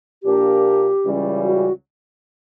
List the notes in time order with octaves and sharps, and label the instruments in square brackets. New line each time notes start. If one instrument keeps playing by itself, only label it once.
[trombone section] A#1 A#2 A#3 D4 A#4 [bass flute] G4
[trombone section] C#2 C#3 E3 G3 C#4
[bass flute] F#4